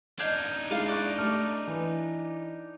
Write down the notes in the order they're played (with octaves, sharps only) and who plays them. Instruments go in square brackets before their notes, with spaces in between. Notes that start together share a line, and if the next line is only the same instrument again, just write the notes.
[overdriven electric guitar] D4 D#4 [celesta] D#5 G#6 [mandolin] F5 G6
[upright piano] G#3 E4 [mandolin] F4 F5
[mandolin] D5 [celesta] C#6 F#6 A6
[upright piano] A3 G4 [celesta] D6 F6
[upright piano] E3 B4